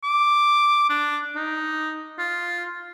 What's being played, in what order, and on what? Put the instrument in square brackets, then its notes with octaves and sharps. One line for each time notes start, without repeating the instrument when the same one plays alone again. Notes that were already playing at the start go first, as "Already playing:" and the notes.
[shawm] D6
D4
D#4
F4